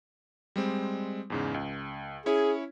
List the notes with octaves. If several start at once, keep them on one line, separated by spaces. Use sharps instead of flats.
G3 G#3 C4
E2 G#2 C#3
C#2
C#4 E4 G#4 C#5